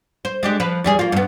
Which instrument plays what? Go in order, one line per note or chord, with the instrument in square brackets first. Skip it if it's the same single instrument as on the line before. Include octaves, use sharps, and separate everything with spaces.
[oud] C5
G#3 D4 G4
F3 B4
E2 G3 G#4
A#3 F4
G2 B3